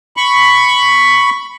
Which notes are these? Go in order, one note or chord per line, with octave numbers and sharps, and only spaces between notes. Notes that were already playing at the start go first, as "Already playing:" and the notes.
B5 C#6